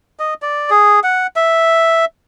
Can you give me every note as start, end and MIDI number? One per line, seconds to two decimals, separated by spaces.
0.19 0.34 75
0.42 0.70 74
0.70 1.00 68
1.04 1.27 78
1.36 2.05 76